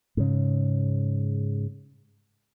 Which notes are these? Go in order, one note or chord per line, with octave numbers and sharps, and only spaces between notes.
G#2 C#3